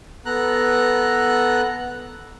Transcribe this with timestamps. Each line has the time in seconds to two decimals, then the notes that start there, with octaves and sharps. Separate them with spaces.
0.26 B3 A4 A#5 F#6